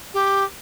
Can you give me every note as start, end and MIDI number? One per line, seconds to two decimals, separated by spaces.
0.13 0.43 67